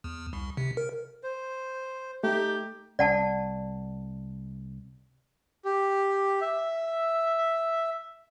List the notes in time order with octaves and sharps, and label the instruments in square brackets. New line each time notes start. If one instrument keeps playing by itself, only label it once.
[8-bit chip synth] E2
C2
C3
A#4
[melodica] C5
[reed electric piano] A3 [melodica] D#4 [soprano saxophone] G4
[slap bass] C2 [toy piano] D5 F#5 A5
[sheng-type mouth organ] G4
E5